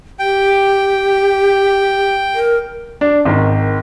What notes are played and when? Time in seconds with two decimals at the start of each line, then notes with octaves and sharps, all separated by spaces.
0.19 G4 G5
2.35 A#4
3.01 D4
3.25 G#1 D#3